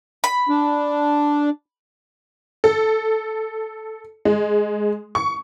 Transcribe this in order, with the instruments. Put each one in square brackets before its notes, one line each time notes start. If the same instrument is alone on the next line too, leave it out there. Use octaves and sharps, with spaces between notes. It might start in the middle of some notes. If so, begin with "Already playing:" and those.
[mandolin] B5
[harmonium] D4
[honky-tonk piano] A4
G#3
C#6